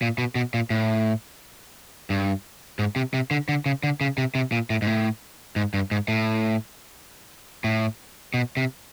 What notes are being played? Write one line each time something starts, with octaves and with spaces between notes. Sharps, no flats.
A#2
B2
B2
A#2
A2
G2
G#2
C3
C3
D3
D3
C#3
D3
C#3
C3
C3
A#2
A2
G#2
A2
G#2
G2
G#2
A2
A2
B2
C3